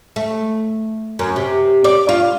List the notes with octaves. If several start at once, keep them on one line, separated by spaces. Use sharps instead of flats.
A3
F#2
C3
D5
F4